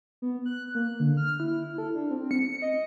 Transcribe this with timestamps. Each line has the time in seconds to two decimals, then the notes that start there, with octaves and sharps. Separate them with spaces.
0.22 B3
0.46 F#6
0.75 A#3
1.00 D3
1.17 F6
1.40 E4
1.78 A4
1.95 D4
2.11 C4
2.31 C#7
2.62 D#5